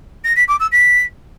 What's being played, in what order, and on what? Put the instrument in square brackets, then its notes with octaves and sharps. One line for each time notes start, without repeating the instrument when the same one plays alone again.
[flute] A#6
B6
D6
E6
B6